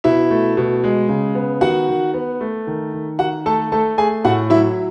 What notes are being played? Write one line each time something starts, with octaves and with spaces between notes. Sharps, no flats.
B2 E4 E5
A3
B2
G#3
C#3
B3
D#3 F#4 F#5
D#3
B3
A3
D#3
D#3
D#3 F#4 F#5
A3 A4 A5
A3 A4 A5
A3 G#4 G#5
A2 F#4 F#5
F#3 E4 E5